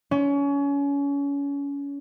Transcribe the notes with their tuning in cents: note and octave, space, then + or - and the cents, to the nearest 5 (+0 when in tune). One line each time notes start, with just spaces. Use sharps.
C#4 +30